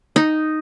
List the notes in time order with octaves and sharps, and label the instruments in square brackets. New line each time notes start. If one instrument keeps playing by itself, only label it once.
[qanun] D#4